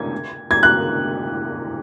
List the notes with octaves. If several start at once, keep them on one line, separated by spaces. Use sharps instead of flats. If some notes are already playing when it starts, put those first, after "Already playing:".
Already playing: G#6
G#6
F#6